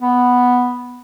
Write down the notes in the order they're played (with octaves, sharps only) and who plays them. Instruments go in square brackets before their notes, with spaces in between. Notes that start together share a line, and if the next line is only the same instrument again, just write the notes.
[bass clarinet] B3